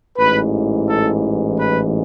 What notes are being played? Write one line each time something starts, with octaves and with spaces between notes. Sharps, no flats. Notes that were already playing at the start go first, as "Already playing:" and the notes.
A1 G#2 E3 B4
A4
B4